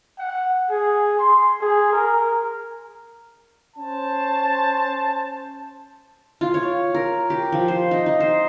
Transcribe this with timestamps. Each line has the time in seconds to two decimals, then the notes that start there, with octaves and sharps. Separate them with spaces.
0.19 F#5
0.70 G#4
1.19 C6
1.61 G#4
1.93 A#4
3.77 C#4 C5 A5
6.41 F4
6.54 C#5
6.95 A#4
7.30 G4
7.52 F3
7.68 C5
7.91 D#4
8.06 D#4
8.20 C5